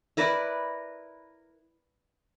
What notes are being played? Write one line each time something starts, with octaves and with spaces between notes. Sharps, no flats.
E4 A#4 B4 D5